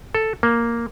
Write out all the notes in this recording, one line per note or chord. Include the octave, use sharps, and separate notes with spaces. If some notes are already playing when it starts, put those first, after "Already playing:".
A4
A#3